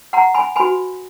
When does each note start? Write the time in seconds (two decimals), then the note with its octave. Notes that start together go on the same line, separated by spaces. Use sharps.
0.13 F#5 A#5
0.34 G#5 B5
0.56 F#4 B4 G#5 B5